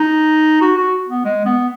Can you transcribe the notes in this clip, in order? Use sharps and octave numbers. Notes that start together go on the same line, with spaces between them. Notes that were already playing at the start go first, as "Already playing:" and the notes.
Already playing: D#4
F#4
F#4
B3
G#3
B3